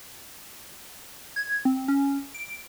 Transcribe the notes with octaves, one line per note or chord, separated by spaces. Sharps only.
G#6
C4
C#4
D7